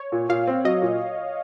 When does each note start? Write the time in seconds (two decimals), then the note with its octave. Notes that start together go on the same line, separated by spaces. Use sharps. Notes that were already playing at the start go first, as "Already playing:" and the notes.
Already playing: C#5
0.12 A#2
0.29 A#2 F5
0.47 C4
0.65 F#3 D#5
0.82 A#2